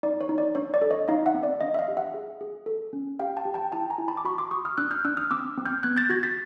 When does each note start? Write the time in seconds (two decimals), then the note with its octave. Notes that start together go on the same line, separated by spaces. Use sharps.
0.03 D#4 D5
0.21 C#5
0.29 D#4
0.38 D5
0.55 D4 C#5
0.74 D5
0.82 A4
0.91 C#5 D#5
1.08 D#4 D#5 F5
1.26 E5 F#5
1.34 C4
1.43 D5 E5
1.61 D4 D#5 F5
1.74 E5
1.79 D#5 F5
1.88 G4
1.97 E5 F#5
2.14 G#4
2.41 G#4
2.66 A4
2.93 C#4
3.19 G4 F5 G5
3.37 G5 A5
3.45 G4
3.54 G5 A5
3.72 E4 G5 A5
3.90 G#5 A#5
3.98 E4
4.08 A5 B5
4.17 D6
4.25 F#4 B5 C#6
4.38 C6 D6
4.51 F#4 C#6 D#6
4.65 D#6 F6
4.78 D4 E6 F#6
4.91 F6 G6
5.05 D4 E6 F#6
5.17 D#6 F6
5.31 C4 D6 E6
5.58 C4
5.66 F6 G6
5.83 B3 F#6 G#6
5.97 G6 A6
6.10 F#4 G#6 A#6
6.23 A6 B6